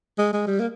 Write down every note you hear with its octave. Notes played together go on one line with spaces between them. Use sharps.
G#3
G#3
G3
A#3